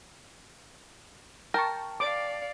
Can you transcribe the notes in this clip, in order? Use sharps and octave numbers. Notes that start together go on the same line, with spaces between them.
A#4 G5 A5 C#6
D5 F5 D6